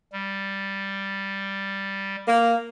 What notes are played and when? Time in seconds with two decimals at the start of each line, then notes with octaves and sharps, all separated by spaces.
0.13 G3
2.26 A#3